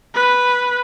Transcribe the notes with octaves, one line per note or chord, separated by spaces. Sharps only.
B4